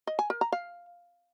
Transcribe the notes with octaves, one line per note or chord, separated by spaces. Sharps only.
D#5
G#5
A#4
A#5
F5